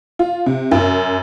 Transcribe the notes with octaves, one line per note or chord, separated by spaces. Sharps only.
F4
C3
F#2